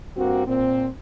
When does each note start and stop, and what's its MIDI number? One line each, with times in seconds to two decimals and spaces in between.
0.17 0.47 43
0.17 0.47 58
0.17 0.47 60
0.17 0.47 66
0.47 0.87 46
0.47 0.87 60